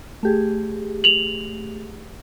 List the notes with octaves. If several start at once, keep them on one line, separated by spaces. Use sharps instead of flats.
A3 G4 G#4
F7 F#7